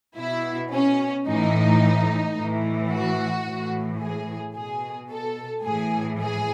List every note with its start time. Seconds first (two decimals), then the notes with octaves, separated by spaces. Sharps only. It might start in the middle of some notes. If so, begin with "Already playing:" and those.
0.17 B2 E4
0.71 C#4
1.26 A2 E3 D#4
2.36 A2 E3
2.91 F#4
3.45 A2 E3
4.01 G#4
4.55 B2 G#4
5.10 A4
5.65 A2 E3 G#4
6.20 G#4